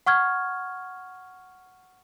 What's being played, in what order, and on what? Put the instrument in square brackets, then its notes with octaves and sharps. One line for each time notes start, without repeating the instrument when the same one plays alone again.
[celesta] F#5 C#6 F6 G#6